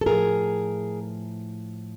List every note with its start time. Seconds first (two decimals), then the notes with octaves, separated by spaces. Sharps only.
0.01 A4
0.06 A2 F3 G#4 A#4